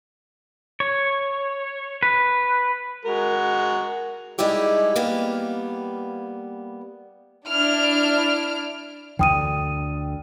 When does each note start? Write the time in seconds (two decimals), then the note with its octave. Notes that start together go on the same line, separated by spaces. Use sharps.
0.80 C#5
2.03 B4
3.05 G#3 F#4 A#4
4.38 G3 G#3 D#4 E4 G4 G#4
4.96 G3 A#3 B3 F5
7.49 D4 E4 F6 D7
9.19 D2 D3 G5 D#6 D#7